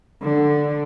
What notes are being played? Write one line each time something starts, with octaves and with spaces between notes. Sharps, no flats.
D3